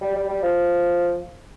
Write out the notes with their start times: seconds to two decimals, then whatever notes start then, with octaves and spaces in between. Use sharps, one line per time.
0.01 G3
0.15 G3
0.28 G3
0.42 F3